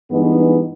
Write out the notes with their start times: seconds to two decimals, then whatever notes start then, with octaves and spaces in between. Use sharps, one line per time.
0.10 G2 E3 G#3 B3 D#4